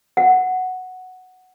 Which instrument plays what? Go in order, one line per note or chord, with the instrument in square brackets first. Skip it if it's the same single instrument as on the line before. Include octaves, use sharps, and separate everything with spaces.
[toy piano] F#5